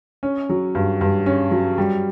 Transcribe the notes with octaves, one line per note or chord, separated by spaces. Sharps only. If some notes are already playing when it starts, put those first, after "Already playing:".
C#4
F#3
G2
G2
C#4
F#3
G3